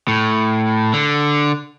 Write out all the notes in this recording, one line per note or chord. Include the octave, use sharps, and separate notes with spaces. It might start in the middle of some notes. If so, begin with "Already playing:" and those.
A2
D3